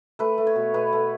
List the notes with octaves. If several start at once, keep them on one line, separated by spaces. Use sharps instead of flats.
A3 B4
A3
C#5
B2
B2 B4
A3